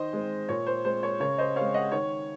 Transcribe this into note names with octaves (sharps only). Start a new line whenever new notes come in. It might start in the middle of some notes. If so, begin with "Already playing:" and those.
Already playing: D#3 C5 D#5
G#3 C4
A#2 C#5
C5
G#3 C4 C5
C#5
C#3 C#5
C5 D#5
G#3 C4 C#5 F5
D#5 F#5
D#3 C#5